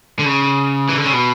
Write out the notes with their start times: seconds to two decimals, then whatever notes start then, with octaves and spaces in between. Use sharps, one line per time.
0.19 D3
0.26 C#3
0.89 E3
0.97 D3
1.05 C#3
1.13 B2